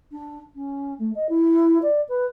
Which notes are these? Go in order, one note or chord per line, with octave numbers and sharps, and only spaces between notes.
D4
C#4
A3
D#5
E4
D5
B4